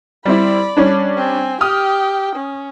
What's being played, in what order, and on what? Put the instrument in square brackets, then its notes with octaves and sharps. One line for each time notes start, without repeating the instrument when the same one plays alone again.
[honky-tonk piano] G3 C4 E4 [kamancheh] D5 B5
[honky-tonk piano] G3 C#4 D4
[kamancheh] C4 G#5
[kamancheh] G4 G5 [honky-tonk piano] D#6 F6
[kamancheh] C#4